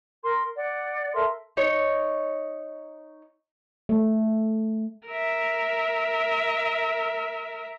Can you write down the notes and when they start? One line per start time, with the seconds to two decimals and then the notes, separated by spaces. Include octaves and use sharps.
0.24 A#4 C6
0.56 D5 F#5
1.14 A4 A#4 E5 C6
1.57 D#4 C#5
3.89 A3
5.08 A#4 E5